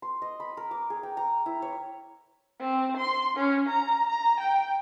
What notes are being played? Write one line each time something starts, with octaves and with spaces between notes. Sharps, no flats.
C6
D#5
B5
A#4
D6
G#4
G5
A#5
E4
C#5
C4
C6
C#4
A#5
A#5
G5